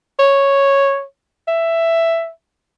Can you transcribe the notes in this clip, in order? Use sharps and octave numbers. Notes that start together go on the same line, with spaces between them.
C#5
E5